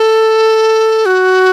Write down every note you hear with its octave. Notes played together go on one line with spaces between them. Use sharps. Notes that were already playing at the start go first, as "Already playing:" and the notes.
Already playing: A4
F#4